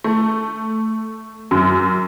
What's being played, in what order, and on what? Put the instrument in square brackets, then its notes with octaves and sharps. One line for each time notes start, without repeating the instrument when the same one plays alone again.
[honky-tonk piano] A3
F#2